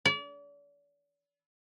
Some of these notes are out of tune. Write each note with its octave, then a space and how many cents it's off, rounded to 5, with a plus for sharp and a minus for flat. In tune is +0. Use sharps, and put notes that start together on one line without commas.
D5 -40